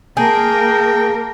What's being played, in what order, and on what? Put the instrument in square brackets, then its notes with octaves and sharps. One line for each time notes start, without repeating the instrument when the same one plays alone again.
[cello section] A#3 A#4 [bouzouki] G#4 [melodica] G5 [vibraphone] A5